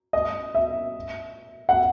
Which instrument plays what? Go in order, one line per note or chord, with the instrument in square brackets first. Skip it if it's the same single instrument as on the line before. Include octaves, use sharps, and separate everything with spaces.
[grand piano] D#5
E5
F#5